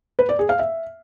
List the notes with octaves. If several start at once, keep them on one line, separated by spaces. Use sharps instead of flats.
B4
D5
G#4
F5
E5